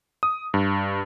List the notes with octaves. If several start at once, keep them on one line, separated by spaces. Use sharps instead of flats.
D#6
G2